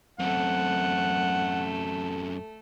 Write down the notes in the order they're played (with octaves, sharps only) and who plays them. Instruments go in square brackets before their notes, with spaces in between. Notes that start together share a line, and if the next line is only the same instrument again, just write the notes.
[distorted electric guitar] F#2 C4 [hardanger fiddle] A3 [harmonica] F#5